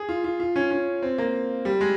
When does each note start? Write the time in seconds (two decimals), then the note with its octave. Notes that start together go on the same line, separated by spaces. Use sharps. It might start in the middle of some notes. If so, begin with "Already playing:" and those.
Already playing: G#4
0.09 F4
0.24 F4
0.40 F4
0.56 C#4
0.71 C#4
1.02 C4
1.18 A#3
1.65 G3
1.81 G#3